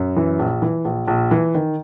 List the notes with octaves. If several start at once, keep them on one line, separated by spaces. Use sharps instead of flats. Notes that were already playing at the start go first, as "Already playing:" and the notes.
Already playing: F#2
E3
A#1
E3
A#1
A#1
E3
D#3